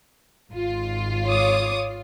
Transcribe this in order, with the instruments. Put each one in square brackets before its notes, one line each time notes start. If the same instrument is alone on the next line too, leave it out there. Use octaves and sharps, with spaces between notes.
[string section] G#1 F4
[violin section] C#5 D6 D#6